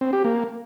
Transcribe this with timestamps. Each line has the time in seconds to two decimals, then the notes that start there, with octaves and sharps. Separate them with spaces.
0.01 C4
0.13 G4
0.24 A#3